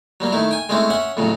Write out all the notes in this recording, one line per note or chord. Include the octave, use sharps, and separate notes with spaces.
F#3 G3 A#3
D#3 A3 E4
G5 G#5
G#3 A3 C4 C#4 E4
C#4 E5 F#5
F2 A2 C#3 F#3